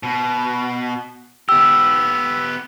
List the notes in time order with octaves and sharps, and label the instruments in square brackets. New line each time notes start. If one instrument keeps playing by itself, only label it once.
[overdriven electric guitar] B2
[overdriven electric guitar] B3 G4 [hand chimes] E6